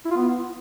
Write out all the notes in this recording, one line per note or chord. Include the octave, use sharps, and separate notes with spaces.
E4
F4
B3